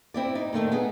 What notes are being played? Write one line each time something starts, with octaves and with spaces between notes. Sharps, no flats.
C4 E4 D5
D#4
A#2 D#3 A3 D4
B3 D#4 G#4